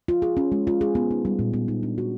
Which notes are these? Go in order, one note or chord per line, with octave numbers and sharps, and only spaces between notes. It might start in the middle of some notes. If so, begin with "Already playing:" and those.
F4
G#4
C#4
G#3
F4
G#4
B3
D#4
G3
A#2
B3
D#4
D4
F#4